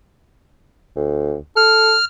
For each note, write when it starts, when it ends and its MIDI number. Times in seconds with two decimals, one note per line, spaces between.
0.96 1.37 38
1.56 1.94 69
1.56 2.05 89